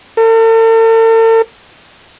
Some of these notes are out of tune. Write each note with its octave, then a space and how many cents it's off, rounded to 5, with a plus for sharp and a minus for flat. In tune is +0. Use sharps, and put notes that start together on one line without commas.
A4 +45